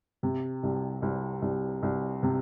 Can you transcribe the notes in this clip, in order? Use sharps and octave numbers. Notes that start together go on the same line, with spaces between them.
C3
C2
C2
C2
C2
C3